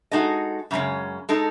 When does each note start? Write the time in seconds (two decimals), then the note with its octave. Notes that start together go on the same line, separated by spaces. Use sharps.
0.11 G#3 D#4 F#4 A4 D#5
0.71 F#2 C#3 G#3 C#4
1.29 G#3 D#4 A4